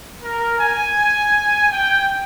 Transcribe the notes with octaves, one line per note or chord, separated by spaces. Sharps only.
A#4
G#5
G5